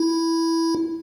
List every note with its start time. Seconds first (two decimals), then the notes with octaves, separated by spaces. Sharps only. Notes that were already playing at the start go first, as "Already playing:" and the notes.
Already playing: E4